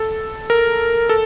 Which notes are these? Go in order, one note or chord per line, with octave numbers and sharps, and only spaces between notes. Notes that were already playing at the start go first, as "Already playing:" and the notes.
Already playing: A4
A#4
A4